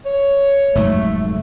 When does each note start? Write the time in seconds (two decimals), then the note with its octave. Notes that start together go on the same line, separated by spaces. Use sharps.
0.06 C#5
0.75 F1 G#2 F#3 A3